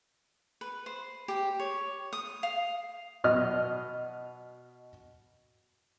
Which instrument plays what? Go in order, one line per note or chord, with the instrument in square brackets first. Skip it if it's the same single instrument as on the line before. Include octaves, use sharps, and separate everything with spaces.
[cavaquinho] B4
C5
G4
C#5
D#6
F5
[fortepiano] B2 D#5 F6